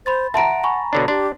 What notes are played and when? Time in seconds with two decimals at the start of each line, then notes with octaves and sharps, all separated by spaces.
0.06 C5 B5 C6 A6
0.34 E5 F#5 A5 A#5 C6 D7
0.64 G#5 B5 C#6
0.93 B2 D3 D4 C#5
1.08 D4 G4 C6